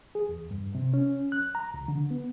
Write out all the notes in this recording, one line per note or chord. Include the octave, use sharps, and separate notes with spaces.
G#4
E2
G2
C3
C#4
F#6
A#5
C#2
D3
B3